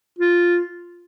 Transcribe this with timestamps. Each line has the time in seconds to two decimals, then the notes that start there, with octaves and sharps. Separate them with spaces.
0.19 F4